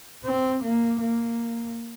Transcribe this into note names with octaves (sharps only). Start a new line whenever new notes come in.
C4
A#3
A#3